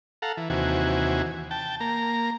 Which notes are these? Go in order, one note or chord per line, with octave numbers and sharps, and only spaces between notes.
A4 F5 F#5 A#5
E3
D#2 C3 E3 F#4 G#5
G5 A5
A#3 A#5